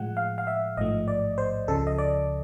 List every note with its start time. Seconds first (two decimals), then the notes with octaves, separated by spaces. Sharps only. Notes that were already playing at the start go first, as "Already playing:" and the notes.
Already playing: A2 F3 G#3 F#5
0.17 F5
0.38 F5
0.47 E5
0.77 A1 G#2 F3 A3 D#5
1.08 D5
1.38 C5
1.68 C#2 C#3 F3 A4
1.87 D#5
1.98 D5